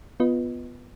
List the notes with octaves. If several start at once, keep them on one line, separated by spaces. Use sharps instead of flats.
B3 F4 B4 D#5